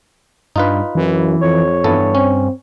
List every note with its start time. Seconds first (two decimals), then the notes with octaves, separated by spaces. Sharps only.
0.56 G2 D#4 F4 B4
0.95 F#2 E3
1.41 F2 C#5
1.84 G2 E3 B3 A4
2.15 C4 C#4